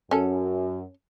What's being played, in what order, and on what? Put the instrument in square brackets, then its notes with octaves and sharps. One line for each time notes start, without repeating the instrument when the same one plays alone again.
[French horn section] F#2 [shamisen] C#4 A4